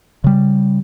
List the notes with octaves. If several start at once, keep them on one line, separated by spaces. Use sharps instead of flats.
C#3 G3